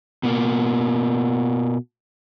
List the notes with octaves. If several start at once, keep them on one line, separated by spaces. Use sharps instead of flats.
B2 A#3